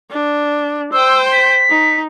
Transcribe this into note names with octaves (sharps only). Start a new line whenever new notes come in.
D4
C5 G5 E6
B6
D#4